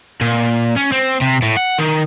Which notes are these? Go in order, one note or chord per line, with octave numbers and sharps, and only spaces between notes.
A#2
C#4
C4
C3
A2
F#5
D#3